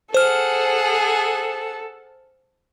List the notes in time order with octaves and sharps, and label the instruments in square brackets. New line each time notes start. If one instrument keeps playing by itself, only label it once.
[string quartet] G#4 F#5 [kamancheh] A4 [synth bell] C5 F6